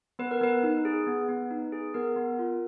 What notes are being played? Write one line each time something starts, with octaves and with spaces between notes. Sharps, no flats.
B3 B4
A#4
B3 B4
D#4
G#4
B3
B3
D#4
G#4
B3 A#4
B3
F4